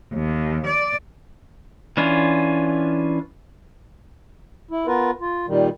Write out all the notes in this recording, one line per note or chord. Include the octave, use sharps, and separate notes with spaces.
D#2
D5
E3 C#4 D4 F4
E4
B3 F4 A#4 B4
F4
A#2 D#3 G3